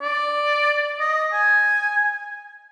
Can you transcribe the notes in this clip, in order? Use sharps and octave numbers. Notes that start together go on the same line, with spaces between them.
D5
D#5
G#5